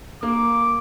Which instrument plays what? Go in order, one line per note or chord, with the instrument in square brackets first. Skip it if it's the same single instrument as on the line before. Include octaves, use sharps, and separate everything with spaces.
[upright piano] A#3 [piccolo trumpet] D6